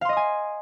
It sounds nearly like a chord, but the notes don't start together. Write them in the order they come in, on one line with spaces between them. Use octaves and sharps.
F5 C6 D#5 D#6 G#5